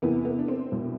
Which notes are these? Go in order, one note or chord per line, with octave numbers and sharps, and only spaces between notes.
E2 C3 E3 B3
B3
D4
C4
C2 B2